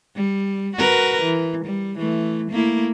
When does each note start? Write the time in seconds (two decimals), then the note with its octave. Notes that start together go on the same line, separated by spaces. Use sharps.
0.16 G3
0.76 F#4 A#4 B4
1.22 E3
1.65 G3
1.99 E3 A3
2.51 A3 A#3 E4